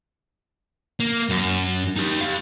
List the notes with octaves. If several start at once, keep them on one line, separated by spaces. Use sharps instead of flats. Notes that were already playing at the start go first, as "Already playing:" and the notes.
A#3
F#2
D#4 G4
G4 F5